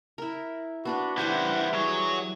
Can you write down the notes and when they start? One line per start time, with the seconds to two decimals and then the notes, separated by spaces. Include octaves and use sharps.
0.18 E4 A#4
0.85 B3 D4 F#4 B4
1.18 E3 G3 E4 G4 C5 F#5
1.73 F#3 G#4 C#5